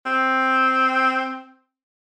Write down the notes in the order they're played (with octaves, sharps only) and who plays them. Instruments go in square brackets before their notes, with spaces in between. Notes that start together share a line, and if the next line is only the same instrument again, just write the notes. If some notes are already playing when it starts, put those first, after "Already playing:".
[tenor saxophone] C4